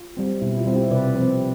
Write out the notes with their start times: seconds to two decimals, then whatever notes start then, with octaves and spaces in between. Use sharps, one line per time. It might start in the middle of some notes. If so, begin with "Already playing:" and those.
Already playing: F4
0.17 G3 C4
0.41 B2 E4
0.58 F4
0.66 G3 C4
0.74 E4 G4
0.91 C3 B4 D5
1.16 F3 C4